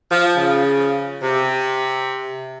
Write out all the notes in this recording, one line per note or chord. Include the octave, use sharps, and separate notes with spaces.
F3
C#3
C3